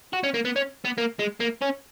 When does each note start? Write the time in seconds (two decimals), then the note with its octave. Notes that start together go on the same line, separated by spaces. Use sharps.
0.13 F#4
0.24 C#4
0.34 A#3
0.45 B3
0.56 C#4
0.85 B3
0.98 A#3
1.19 G#3
1.41 A#3
1.62 C#4